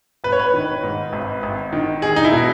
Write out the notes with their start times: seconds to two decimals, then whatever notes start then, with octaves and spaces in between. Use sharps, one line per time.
0.24 G#1 B4
0.32 C#5
0.39 B4
0.54 D#3
0.83 G#2
1.13 G#1
1.43 G#1
1.73 D#3
2.02 E1 G#4
2.16 D#4
2.25 E4
2.32 B2